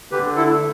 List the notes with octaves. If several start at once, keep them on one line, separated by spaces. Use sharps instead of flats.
D3 G4 B4
E4 A4
A3